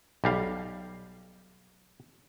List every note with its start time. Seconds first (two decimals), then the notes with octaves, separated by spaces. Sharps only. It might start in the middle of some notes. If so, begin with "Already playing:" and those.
0.24 B1 G3 F5